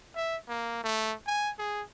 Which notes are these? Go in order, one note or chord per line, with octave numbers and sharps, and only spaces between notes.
E5
A#3
A3
G#5
G#4